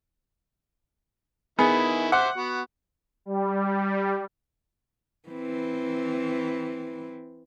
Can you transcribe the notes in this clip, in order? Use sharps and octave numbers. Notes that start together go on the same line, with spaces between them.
D#3 B3 E4 G#4
C5 E5 F#5 D6
B3 F#4
G3
E3 C4